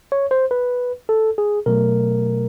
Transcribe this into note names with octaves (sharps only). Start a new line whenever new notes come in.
C#5
C5
B4
A4
G#4
B2 F#3 A3 A#4